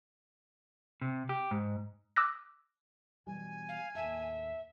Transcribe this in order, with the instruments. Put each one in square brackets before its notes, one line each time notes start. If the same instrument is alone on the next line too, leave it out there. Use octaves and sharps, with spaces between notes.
[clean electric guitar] C3
G4
G#2
[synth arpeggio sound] D6 E6 F#6 A#6
[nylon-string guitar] B2 E3 G3 [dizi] G#5
[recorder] F5
[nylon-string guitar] D#2 A2 A5 [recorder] E5